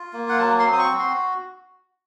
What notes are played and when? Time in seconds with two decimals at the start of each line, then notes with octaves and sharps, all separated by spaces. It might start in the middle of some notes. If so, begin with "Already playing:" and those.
Already playing: F4
0.13 A#3
0.29 F#5
0.39 F#3 A5
0.59 C6
0.66 C4
0.73 D#6
0.79 C#6
0.92 F#4
0.99 C6